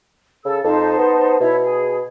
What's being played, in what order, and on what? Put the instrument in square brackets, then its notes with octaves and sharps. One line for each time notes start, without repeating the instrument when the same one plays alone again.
[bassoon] C#3 [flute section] A4 E6
[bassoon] F2 [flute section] D#4 C5 A5
[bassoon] B3
[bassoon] B2 [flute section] E4 C#5 E5
[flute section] G#4